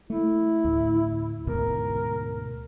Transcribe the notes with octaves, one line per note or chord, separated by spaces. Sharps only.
A3 E4
D2 A2
D2 G#2 B2 A#4